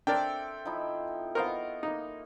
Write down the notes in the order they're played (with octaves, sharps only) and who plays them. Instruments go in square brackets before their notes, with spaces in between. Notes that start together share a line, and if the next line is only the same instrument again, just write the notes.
[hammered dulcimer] C4 A4 E5 [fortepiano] D4 A#4 D5 [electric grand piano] G5
[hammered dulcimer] F3 D#4 E4
[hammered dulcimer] B3 D#5 C#6 [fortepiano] A#4 C5 F5
[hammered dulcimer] A#3 [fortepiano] D#4